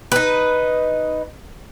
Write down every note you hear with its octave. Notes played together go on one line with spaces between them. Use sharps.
D#4 B4